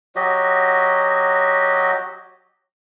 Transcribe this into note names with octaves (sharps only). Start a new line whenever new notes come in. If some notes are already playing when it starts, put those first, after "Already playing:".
F#3 F#4 G4 D#5